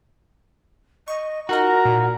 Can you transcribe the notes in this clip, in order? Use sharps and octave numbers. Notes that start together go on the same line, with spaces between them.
D#5 C#6
D#4 F4 F#4 A#4 D#5 A#5
A#2